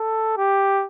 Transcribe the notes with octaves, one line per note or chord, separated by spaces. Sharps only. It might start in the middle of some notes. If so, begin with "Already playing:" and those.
Already playing: A4
G4